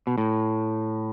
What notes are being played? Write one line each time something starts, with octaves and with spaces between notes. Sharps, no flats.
B2
A2